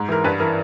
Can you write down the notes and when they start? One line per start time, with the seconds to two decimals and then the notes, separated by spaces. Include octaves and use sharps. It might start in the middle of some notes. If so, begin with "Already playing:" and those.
Already playing: G#2
0.08 E3 A#4
0.24 G2 B4
0.40 E3 A#4